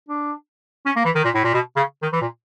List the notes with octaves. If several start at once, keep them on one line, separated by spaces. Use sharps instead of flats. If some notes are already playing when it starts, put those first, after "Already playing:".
D4
C#4
A#3
E3
D#3
A#2
A2
A#2
B2
C#3
D#3
E3
A#2